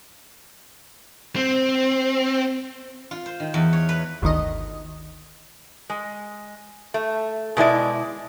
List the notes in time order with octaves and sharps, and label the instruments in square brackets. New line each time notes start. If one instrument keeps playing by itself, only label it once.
[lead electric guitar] C4
[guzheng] F4
C5
D#3
E2
C#5
B4
[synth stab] G1 D2 D#3 D#5
[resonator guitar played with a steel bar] G#3
A3
B2 G#3 E4 D5